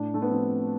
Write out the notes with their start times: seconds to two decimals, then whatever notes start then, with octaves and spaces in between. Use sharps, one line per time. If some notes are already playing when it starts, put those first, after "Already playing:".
Already playing: A2 D4
0.14 A3
0.22 B3
0.30 F3 C4